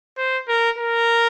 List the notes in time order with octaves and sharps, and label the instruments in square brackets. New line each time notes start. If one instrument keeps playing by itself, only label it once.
[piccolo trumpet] C5
A#4
A#4